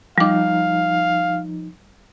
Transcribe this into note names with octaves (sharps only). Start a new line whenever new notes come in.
F3 G3 D#4 F5 D6